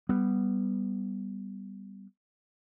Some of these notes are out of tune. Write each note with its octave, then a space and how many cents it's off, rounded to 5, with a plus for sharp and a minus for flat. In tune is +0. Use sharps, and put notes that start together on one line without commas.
G3 +0 B3 +0